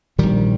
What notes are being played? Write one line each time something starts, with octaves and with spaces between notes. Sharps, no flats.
A#1 A#2 D#3 G3